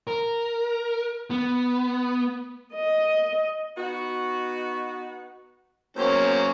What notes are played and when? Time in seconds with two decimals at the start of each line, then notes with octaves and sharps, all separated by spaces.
0.07 A#4
1.30 B3
2.74 D#5
3.77 B3 D#4 F#4
5.97 E2 F#3 A#3 C4 C#4 C5